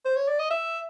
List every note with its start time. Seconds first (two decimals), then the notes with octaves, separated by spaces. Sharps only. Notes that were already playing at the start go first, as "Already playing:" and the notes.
0.05 C5
0.16 C#5
0.28 D5
0.39 D#5
0.51 E5